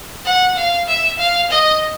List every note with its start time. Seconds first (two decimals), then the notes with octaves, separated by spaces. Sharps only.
0.25 F#5
0.56 F5
0.88 E5
1.19 F5
1.51 D#5